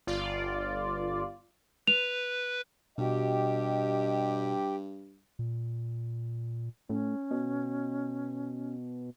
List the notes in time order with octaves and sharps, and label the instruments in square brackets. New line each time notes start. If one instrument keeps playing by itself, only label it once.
[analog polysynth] G1 F4 D5
[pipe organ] B4 [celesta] F7
[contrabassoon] G2 [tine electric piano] B2 F#4 [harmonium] G4 [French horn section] D#5
[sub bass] A#2
[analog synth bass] A2 [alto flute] C#4
[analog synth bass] B2